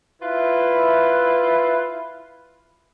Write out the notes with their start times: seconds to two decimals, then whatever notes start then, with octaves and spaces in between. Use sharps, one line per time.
0.22 E4 F4 B4